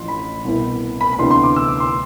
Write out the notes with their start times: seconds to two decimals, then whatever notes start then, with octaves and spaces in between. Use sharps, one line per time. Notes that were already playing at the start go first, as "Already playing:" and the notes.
Already playing: A1 A2 F3 C6
0.08 B5
0.45 C2 B2 B3 E4
1.01 B5
1.13 B5
1.18 D2 C3 E3 B3 D4 C6
1.31 C6
1.43 D6
1.56 E6
1.68 D6
1.80 C6